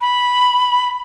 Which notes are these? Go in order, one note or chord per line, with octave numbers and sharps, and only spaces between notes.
B5